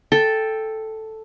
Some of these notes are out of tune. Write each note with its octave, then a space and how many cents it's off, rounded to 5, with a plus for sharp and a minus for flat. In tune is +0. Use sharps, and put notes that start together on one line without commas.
A4 +0 G5 +10